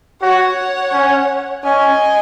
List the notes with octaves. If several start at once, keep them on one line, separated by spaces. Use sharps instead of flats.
F#4 C#5 F#5
C#4
C#4 D#5 G#5